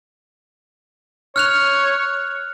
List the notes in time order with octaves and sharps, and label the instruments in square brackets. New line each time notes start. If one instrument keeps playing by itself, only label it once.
[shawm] C#5 [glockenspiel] F6 F#6 F7